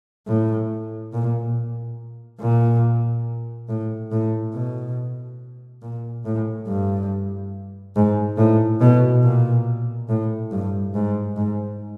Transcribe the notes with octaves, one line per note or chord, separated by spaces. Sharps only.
A2
A#2
A#2
A2
A2
B2
A#2
A2
G2
G#2
A2
B2
A#2
A2
G2
G#2
G#2